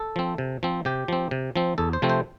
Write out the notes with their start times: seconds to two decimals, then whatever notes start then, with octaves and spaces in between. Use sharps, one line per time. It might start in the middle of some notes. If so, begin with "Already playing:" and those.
Already playing: A4
0.16 F3 C4
0.38 C3
0.63 F3 C4
0.85 C3 G4
1.08 F3 C4
1.31 C3
1.56 F3 C4
1.78 E2 A4
1.93 C5
2.02 C3 F3 A3 C4
2.10 C5